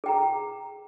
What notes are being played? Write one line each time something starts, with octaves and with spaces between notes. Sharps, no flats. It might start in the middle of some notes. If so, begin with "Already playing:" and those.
G#4 G5 A#5